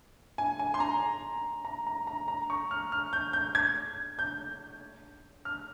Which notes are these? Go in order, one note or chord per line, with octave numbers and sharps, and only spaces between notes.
G#5
G#5
C6
A#5
A#5
A#5
A#5
A#5
C#6
F6
F6
G6
G6
G#6
G6
F6